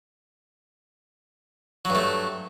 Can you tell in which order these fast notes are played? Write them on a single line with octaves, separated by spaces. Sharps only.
F#3 G2 A3